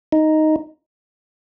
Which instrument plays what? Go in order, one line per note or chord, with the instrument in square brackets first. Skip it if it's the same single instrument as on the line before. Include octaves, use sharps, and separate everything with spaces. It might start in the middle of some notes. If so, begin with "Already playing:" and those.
[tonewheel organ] D#4